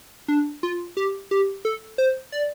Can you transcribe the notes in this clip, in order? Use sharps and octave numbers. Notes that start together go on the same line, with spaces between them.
D4
F4
G4
G4
A4
C5
D5